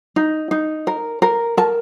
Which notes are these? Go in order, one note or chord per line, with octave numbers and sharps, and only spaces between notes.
D#4
D#4
A#4
A#4
A#4 A5